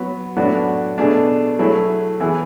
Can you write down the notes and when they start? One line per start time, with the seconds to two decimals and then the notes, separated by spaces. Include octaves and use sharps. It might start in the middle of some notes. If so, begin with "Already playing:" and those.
Already playing: F#3 B3 F#4
0.37 A2 F#3 B3 D4 F#4
0.98 B2 A3 D4 G#4
1.59 F#3 A3 E4 G#4
2.20 E3 B3 E4 G#4